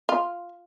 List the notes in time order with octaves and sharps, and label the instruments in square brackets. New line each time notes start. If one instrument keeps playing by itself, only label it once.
[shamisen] F4